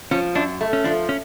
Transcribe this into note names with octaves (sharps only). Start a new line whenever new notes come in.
F3 C#4
F#2 D4
A3
C#4
F3 D4
C#4